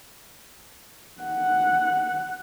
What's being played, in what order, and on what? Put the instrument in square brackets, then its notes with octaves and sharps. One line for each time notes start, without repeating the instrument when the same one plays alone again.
[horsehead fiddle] F#5